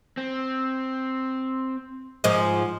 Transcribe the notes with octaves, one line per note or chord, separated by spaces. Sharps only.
C4
G#2 F3 G#3